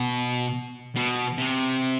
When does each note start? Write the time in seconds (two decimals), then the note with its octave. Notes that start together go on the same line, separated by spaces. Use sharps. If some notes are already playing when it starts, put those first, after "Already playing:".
Already playing: B2
0.96 B2
1.38 C3